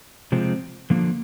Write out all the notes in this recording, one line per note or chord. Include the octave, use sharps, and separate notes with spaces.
C3 F3 G#3 C4
D3 F3 A#3